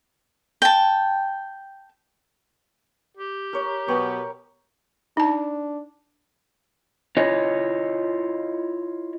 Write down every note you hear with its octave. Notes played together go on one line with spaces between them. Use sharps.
G5 A5
G4
A#4 C#5
B2 F#3 B3 G5 C#6
D4 D#4 A5
E4 F4 C#5 D#5